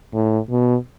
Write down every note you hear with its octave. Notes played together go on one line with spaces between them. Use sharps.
A2
B2